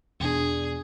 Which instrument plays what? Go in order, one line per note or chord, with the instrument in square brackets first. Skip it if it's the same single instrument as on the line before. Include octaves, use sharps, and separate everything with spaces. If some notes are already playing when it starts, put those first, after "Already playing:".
[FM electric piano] E2 B2 D4 [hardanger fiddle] G#4